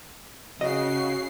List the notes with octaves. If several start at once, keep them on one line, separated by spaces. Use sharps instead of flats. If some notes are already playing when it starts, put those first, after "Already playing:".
C#3 F#4 D#5 C7